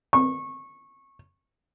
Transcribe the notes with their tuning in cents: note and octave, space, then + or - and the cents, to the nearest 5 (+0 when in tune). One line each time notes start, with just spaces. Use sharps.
C#6 -20